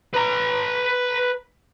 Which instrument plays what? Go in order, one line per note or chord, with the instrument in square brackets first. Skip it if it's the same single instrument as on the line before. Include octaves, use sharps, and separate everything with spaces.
[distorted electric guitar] B4 A#5